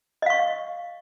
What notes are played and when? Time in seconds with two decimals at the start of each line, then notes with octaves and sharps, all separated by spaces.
0.22 D#5
0.26 F5
0.30 C#6